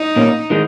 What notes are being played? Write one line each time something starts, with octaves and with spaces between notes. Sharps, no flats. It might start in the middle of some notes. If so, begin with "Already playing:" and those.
Already playing: D#4
A#2 A#3 C#4
D#3 G#3 D#4